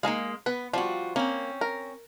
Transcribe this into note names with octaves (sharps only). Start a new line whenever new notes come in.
G#3 A#3 D#4 G#4 F5
B3 B4
F3 G3 F4 F#4
A#3 C4 C#4
A#4